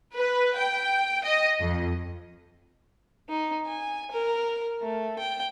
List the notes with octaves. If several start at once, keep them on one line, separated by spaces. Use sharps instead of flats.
B4
G5
D#5
F2
D#4
G#5
A#4
A3
G5